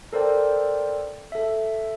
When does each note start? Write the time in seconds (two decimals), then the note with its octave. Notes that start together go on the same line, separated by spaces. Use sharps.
0.13 A4 A#4 C5 D5 G5
1.32 A4 E5